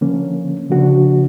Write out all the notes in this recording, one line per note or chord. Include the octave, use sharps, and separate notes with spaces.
D3 F3 A#3 C#4
C#3 F3 A#3 D4 F#4